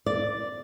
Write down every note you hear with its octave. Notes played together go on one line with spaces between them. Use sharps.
D5